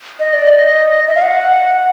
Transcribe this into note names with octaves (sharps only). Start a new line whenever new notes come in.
D#5
D5
D#5
E5
F5
F#5